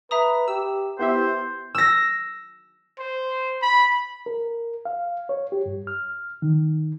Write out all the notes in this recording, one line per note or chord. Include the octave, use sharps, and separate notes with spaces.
B4 E5 A#5 D#6
G4 E6
B3 E4 G4 C5 E5
E6 A#6
C5
B5
A#4
F5
C#5
G4
G2
F6
D#3